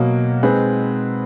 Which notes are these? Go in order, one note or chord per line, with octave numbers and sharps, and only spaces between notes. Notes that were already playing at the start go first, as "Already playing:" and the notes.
Already playing: B2 F#3 A#3
G#3 C4 D#4 G#4 B4